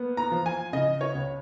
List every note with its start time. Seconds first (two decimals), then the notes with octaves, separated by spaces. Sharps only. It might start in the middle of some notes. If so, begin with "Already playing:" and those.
Already playing: A#3 B3
0.17 A#5
0.31 F3
0.46 G#5
0.73 C#3 D#5
1.01 C#5
1.15 C#2